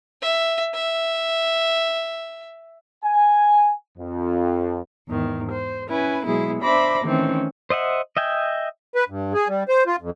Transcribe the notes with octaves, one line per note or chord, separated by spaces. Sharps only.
E5
E5
G#5
F2
E2 G#2 D#3
C5
C#4 E4 B4 G#5
B2 F#3 G#3 B3 E4 G#4
D4 C5 E5 B5 D6 A#6
D#3 E3 A3 C4 C#4
C5 D#5 E5 F#5
D#5 E5 G5 G#5
B4
G2
G#4
G3
C5
F4
F2